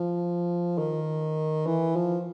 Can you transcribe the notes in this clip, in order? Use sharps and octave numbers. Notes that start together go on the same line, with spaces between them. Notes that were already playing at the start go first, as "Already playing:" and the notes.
Already playing: F3
D#3
E3
F3